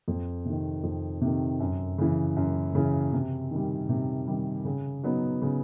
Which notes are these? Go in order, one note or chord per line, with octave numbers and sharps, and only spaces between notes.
F2
C3 D#3
F2
C3 D#3
F#2
C#3 E3
F#2
C#3 E3
C3
D#3 G3
C3
D#3 G3
C#3
F#3 B3 D#4
C#3